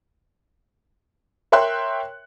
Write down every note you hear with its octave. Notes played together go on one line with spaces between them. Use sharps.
A#4 C#5 E5 G5 C6 F#6